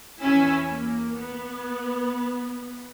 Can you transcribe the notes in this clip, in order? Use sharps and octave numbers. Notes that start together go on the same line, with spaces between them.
E2 C#4 E4 G#5 E6 B6
A#3
B3